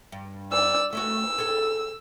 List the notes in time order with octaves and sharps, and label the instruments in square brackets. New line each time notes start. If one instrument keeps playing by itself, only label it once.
[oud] G2
[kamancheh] D5 E6
[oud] A3 C#4 F#4 [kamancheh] E6
[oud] G#4 A4